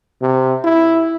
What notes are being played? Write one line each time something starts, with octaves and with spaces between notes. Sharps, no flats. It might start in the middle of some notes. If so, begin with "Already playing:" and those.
C3
E4